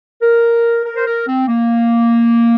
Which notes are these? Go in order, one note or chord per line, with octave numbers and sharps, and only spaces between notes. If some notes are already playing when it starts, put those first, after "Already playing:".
A#4
A#4
C5
A#4
C4
A#3